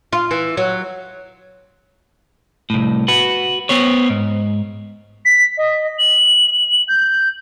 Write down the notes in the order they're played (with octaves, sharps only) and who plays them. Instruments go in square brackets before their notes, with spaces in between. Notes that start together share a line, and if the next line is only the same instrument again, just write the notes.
[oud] F4
E3
F#3
[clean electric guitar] C2 A2
F#4 B4
B3 C5 C#5
G#2
[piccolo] B6
D#5
F#7
G6